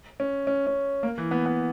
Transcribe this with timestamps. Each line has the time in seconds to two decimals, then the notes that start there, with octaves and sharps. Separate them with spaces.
0.20 C#4
0.47 C#4
0.67 C#4
1.03 A#3
1.18 E3
1.31 B3
1.46 B3